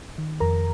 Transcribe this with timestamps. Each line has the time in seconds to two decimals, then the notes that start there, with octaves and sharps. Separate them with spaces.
0.18 D#3
0.40 F2 A#4 A#5